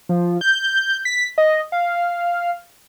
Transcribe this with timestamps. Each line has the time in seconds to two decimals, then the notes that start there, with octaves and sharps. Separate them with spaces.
0.09 F3
0.41 G6
1.05 B6
1.38 D#5
1.72 F5